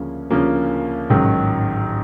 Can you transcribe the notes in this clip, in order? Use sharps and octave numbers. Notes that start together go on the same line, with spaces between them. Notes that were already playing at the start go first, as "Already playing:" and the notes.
Already playing: D2 C#3 F3 A#3 C#4
D2 C#3 F3 A#3 C#4
A1 G#2 D#3 F#3